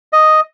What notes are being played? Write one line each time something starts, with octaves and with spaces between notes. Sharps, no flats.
D#5